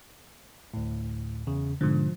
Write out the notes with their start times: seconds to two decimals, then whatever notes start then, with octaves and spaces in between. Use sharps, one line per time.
0.74 D2 A2
1.47 E2 C#3
1.81 G#2 B2 D3 F3